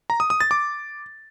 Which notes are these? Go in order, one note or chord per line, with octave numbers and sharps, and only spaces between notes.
A#5
D#6
D#6
A6
D6